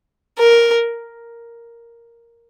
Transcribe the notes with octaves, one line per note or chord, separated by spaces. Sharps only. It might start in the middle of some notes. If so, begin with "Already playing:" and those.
A#4